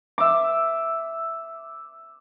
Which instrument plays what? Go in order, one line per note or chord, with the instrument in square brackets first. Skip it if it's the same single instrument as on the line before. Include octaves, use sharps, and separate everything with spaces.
[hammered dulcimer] E5 D6